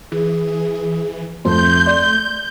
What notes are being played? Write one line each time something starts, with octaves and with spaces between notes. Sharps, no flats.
E3 G#4
F2 A3 C6 G6
D5